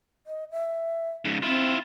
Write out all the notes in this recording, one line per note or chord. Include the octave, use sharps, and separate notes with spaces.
D#5
E5
G#2 C#3
C4 E4 F4